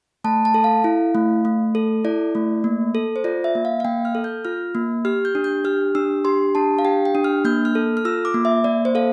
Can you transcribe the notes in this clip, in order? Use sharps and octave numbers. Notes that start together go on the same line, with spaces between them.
A3 A5
A5
A4
F5
E4
A3
A3
A4
E4 D5
A3
A#3
A4
C5
F4 D5
E5
A#3
F5
F5
A#3 G5
F6
A4
G6
F4 F6
A#3
G4 F6
G6
D4
G6
G4 F6
D4 E6
G4 C6
D4 A5
F5
G4 G5
G5
D4
F6
A#3 G6
F6
A4
F6
F4 E6
D6
A#3
E5
A#3 D5
C5
A4 F5